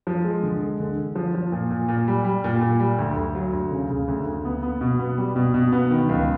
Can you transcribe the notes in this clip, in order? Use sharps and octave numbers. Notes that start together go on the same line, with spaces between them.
F3
G#3
D3
G#3
D3
D3
F3
F3
A#2
A#2
A#2
G3
G3
A#2
A#2
G3
D2
D2
F#3
D2
C#3
C#3
D2
D2
B3
B3
B2
B3
G3
B2
B2
B3
D#3
C#2